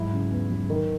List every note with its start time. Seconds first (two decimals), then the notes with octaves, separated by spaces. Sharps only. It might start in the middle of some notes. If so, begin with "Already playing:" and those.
Already playing: G#2 F#3 E4
0.13 C#3
0.32 E2
0.50 F#3
0.70 D#3